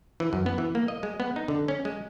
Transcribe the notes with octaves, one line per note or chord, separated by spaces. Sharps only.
E3
F#2
B3
E3
A#3
D#5
G#3
B3
D#4
D3
C#4
G#3